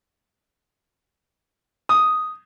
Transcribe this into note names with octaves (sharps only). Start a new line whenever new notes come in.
D#6